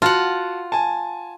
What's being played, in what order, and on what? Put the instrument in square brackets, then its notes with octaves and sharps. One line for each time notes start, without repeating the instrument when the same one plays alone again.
[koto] F4 F#5 [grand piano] F#4 A5
[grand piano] G#5 A5